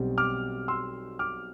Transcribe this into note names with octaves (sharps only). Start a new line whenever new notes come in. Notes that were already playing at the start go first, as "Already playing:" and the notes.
Already playing: B1 B2 G3 C4
D6 F6
C6 E6
D6 F6